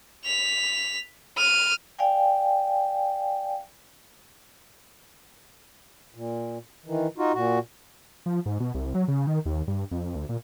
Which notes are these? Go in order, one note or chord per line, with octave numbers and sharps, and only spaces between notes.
B6 F7
F6 D#7
D5 F5 G5 G#5
A#2
D#3 E3
D#4 F4 F#4
A#2 F#4
F3
G#2
B2
C2
F#3
C#3
D#3
D#2
G2
F2
D2
A#2